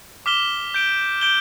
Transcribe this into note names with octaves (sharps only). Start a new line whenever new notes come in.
D6 F6 B6 E7 G7
G6 D7 G7
G6 D7 G7